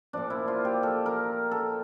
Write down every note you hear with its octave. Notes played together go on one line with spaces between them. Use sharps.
A#2 F3 D4
E4
F4
G4
A4
A#4
A4